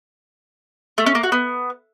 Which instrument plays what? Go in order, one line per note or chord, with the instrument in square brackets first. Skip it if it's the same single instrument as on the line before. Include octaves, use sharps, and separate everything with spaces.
[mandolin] A3
C#4
A#3
F#4
B3